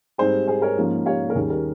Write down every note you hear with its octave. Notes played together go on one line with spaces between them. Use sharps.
G#2 G3 C4 D#4 G#4 C5
G#4 C5
A#4 C#5
G#2 F3 A#3 C#4
C#5 F5
A#4
D#2 D#3 G3 C#4 G#4
A#4